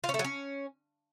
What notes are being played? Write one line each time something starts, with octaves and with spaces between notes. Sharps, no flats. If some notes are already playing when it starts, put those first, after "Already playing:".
F4
C#4
A3
F#3
C#4